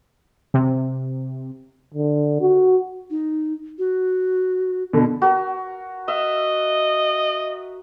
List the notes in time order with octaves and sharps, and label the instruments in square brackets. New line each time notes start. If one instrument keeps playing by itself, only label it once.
[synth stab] C3
[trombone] D3
F#4
[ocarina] D#4
F#4
[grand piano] B2 D3
[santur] F#4 A#4
[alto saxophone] D#5 [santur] E5